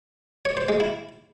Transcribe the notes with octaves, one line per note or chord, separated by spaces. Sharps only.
C#5
C5
G#3
E4